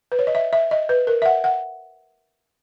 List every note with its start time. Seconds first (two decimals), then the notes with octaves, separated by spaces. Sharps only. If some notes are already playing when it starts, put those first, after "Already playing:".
0.12 B4
0.19 C#5
0.27 D#5
0.35 E5
0.53 E5
0.71 D#5
0.89 B4
1.07 A#4
1.22 E5
1.26 F#5
1.44 F#5